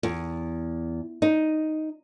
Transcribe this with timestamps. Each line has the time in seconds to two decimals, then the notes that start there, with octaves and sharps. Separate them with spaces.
0.03 E2
1.22 D#4